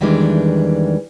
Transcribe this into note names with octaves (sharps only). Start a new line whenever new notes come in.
E2 D#3 E3 G3 G#3 D4